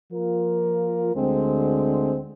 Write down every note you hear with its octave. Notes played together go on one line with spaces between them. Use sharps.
F3 A#3 F4 A#4
D2 D3 G#3 C4